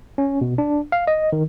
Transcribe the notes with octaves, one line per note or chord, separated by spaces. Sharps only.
C#4
B2
D4
F5
D#5
D#3